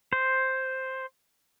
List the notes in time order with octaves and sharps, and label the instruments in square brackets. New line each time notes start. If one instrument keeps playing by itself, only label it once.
[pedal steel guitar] C5